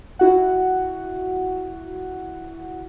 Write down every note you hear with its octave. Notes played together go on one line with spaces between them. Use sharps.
E4 F#4 F#5